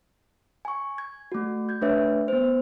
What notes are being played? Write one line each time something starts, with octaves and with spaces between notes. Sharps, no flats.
G#5 C#6
G#6
A3 F#4
G6 G#6
A3 D4 B4 C#5 E5
B3 C5